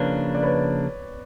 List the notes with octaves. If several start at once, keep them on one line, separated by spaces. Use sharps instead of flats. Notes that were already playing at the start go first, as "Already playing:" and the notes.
Already playing: C#3 F3 A#3 D4 B4 C#5
D5
B4 C#5